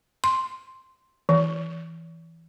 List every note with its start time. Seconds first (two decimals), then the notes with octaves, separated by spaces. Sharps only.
0.24 C6
1.29 E3